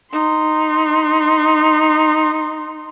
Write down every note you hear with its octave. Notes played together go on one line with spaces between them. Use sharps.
D#4 C6